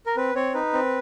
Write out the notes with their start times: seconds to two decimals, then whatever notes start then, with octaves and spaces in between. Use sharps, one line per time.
0.06 A#4
0.16 C4 B4
0.35 C4 C#5
0.54 D#4 B4
0.73 C4